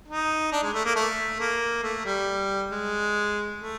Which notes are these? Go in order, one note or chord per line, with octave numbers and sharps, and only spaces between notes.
D#4
D4
G#3
A3
A#3
A3
A#3
A3
G3
G#3
A3